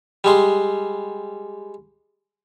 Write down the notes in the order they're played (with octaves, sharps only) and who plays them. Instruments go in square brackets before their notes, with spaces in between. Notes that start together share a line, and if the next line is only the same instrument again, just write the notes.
[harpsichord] G3 G#3 C6